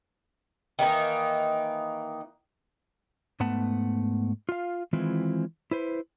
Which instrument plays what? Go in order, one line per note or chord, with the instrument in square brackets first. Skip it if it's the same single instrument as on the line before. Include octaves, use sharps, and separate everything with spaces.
[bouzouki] D#3 E3 A#3 D#4
[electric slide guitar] G#2 A3 B3 F#5 A5
F4 F5
D#3 E3 G#3 C4 E4 F4
E4 B4 C5